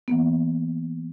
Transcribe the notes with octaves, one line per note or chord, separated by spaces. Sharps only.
E3 A#3 B3